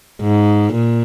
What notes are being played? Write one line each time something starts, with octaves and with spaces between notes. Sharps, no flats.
G#2
A#2